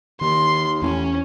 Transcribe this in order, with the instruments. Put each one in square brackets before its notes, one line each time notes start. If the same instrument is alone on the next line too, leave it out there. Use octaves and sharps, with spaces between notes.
[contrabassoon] D#2 [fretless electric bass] D#3 [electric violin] C6
[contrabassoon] A1 [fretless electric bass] E2 [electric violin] C#4